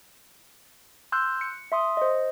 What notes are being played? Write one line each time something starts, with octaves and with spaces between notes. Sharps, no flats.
C6 E6 F#6 G6
C#7
E5 C6 D#6
C5 D#5